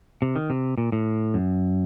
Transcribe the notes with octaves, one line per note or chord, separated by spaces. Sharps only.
C3
D#3
C3
A#2
A2
F#2